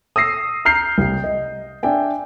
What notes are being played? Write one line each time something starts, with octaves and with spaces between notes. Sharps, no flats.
D#6 E6 A#6 C7
A#5 F6 G6 C7
C2
D#5
D4 E5 G5 G#5